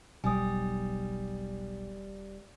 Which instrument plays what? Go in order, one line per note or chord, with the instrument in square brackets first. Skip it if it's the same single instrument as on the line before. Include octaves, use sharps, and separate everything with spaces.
[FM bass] E1 [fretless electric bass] B1 [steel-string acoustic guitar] G3 [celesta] G#5 D#6